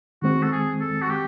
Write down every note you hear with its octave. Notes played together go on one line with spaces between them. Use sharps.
D#3 G#3 C4 F#4
A4
G#4
A4
F#4
G4